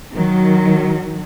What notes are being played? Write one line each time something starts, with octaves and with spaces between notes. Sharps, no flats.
D#3 F#3